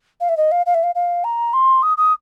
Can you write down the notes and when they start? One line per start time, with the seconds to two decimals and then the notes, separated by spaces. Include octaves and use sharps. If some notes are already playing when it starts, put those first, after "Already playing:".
0.20 F5
0.29 E5
0.37 D#5
0.51 F5
0.66 F5
0.74 E5
0.83 F5
0.95 F5
1.24 A#5
1.53 C6
1.82 D#6
1.97 D#6